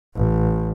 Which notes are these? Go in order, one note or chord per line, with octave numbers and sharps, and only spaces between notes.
A1